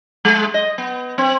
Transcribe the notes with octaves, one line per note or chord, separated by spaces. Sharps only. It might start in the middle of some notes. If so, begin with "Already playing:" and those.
G#3
D#5
B3
C4